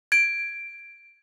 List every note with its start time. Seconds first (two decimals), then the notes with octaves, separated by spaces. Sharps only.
0.12 G#6 D7